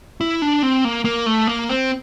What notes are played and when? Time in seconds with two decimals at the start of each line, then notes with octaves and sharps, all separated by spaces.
0.21 E4
0.42 D4
0.63 C4
0.85 A#3
1.05 A#3
1.26 A3
1.47 A#3
1.69 C4